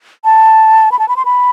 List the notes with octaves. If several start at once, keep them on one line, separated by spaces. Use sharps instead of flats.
A5
B5
A5
B5
C6
B5